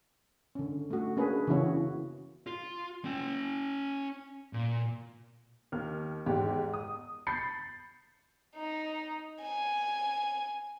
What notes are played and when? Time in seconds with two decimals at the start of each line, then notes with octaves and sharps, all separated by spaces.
0.55 D3 C#4
0.90 A3 F#4
1.17 A#3 C#4 D4 G#4 A#4 B4
1.47 C#3 E3 B3 E4 F#4 C#5
2.47 F4
3.05 C#4 G5
4.53 A#2
5.72 D#2 F6
6.26 E2 G#2 G4
6.74 D#6
7.27 B5 G6 A6 C7 C#7
8.56 D#4
9.43 G#5